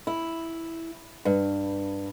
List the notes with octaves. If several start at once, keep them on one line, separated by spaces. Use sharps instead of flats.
E4
G2